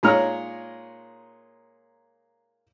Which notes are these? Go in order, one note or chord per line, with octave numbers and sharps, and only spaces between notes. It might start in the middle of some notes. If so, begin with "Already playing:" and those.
A#2 G#3 D#4 C#5 A#5 F6